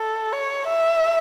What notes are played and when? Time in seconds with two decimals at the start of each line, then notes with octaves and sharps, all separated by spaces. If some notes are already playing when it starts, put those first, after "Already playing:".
Already playing: A4
0.33 C#5
0.69 E5